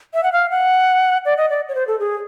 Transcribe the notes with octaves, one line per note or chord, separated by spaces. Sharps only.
E5
F#5
F5
F#5
D5
D#5
D5
C#5
C5
A4
G#4